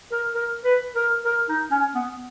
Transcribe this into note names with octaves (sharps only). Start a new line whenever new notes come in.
A#4
A#4
B4
A#4
A#4
D#4
C#4
B3